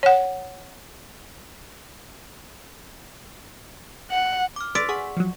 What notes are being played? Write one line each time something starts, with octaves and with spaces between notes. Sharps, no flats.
C#5 F#5
F#5
D6 F6
D5 C6 E6 B6
G#4 F#5 C#6
F3 F#3